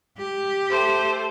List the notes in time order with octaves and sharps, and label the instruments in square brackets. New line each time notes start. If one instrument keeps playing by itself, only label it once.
[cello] G4
[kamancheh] A3 C5